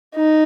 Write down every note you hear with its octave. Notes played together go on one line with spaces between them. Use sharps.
D#4